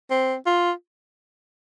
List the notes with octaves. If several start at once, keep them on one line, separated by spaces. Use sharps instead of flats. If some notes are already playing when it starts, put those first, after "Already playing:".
C4
F4